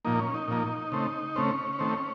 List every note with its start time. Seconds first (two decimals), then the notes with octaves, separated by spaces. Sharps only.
0.05 A#2 F3 A#3 D#4
0.19 C#4
0.34 D#4
0.48 A#2 F3 A#3
0.92 C#3 A3 C4
1.36 C#3 A3 C4 C#4
1.79 D#3 A3 C4